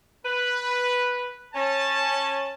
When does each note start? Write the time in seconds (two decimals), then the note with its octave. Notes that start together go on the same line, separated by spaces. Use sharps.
0.25 B4
1.54 C#4 A5